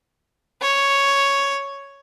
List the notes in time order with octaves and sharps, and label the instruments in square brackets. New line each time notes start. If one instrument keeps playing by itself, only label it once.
[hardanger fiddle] C#5